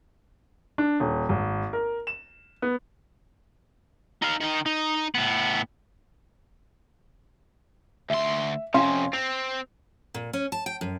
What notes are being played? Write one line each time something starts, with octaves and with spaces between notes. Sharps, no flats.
D4
D#1
G#1
A#4
E7
B3
D#4 F5
D#3 D#4
D#4
A2 B3
D2 E5 C6
F2 C3 C#4 F5 C6
C4 F7
A#2
C#4
A5
G5
F#2